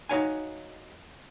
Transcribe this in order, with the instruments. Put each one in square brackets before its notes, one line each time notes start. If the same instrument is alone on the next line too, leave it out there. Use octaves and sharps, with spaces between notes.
[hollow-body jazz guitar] D#4 F4 F#4 C#5 F5 G#5